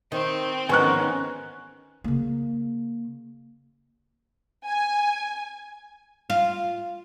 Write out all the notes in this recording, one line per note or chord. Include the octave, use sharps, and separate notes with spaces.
D#3 C4
G#2 D#3 B3 C#4 G#5 C#6 F#6
C#3 A#3
G#5
F4